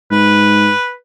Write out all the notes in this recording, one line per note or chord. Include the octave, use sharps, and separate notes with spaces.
G#2 B4